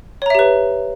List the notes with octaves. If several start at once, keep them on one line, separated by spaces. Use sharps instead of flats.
G4 B4 C#5 E5 A#5